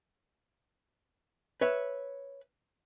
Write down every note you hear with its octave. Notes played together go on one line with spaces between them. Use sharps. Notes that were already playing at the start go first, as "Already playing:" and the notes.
B4 C#5 E5